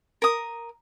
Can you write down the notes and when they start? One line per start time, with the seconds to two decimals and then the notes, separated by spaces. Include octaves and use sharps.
0.22 A#4 D#6